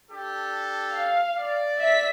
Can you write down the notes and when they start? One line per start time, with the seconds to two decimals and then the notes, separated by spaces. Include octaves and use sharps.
0.11 D4 G4 A4
0.91 F5
1.38 D5
1.78 E5 B6